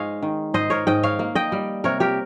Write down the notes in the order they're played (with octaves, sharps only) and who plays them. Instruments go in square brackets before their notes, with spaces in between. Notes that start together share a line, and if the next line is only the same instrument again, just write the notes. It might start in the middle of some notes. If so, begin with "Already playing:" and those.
Already playing: [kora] G#2 G#3 C#5 D#5 F5
D#3
G#2 C5 D#5
A#4 C#5
G#2 D#5 G5
C#5 F5
A#3
D#5 G5
G3
C3 A#4 C#5
G4 A#4